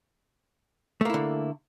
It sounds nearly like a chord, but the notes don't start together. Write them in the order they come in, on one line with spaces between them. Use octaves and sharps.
A3 A#3 E4 D3